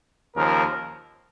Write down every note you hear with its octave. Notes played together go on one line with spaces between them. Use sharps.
D#2 C#3 F3 A#4